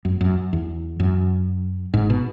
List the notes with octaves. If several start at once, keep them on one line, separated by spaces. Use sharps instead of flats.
F#2
F#2
E2
F#2
G#1 G#2
B2